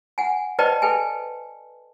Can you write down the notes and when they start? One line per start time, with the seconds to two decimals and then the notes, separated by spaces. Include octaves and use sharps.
0.18 F#5 G#5
0.59 B4 C5 D5 D#5 G5 A5
0.82 A4 B4 G5 G#5